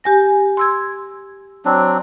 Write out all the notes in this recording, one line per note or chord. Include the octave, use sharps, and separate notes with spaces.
G4 G#5 A#6
C6 E6 G#6
F#3 C4 D4